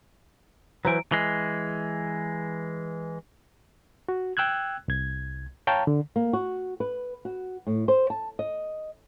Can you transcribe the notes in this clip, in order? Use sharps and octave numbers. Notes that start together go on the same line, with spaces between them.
E3 F#3 B4 C5 G#5 A#5 D7
E3 G#3
F#4
G5 E6 F#6 G#6
C2 G#6
C#5 F5 G5 A5 A#5
D3
A#3
F#4
B4
F#4
A2
C5
A5
D#5